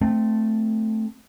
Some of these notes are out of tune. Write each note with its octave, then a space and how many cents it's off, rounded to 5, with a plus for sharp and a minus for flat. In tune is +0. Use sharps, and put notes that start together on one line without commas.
A3 +0 C4 -5